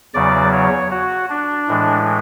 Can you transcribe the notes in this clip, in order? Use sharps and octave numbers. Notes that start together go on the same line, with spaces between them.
E2 C#3 F#3 D5
C#5
F#4
D4
A2 E3 G#3